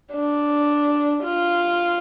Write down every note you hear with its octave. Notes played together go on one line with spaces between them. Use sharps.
D4
F4